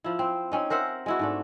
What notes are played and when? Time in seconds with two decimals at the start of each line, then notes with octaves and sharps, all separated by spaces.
0.04 F3 E4
0.19 C4
0.52 C4 C#4 D#4
0.70 A#4 C5 E5 F#5
1.06 G#3 E4 F#4
1.19 G#2 A3 D4